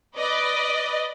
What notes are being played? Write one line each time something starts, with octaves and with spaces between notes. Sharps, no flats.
B4 D5 D#5